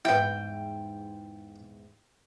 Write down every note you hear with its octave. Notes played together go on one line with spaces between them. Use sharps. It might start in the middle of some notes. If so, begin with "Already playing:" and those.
E2 G#2 B3 E4 G5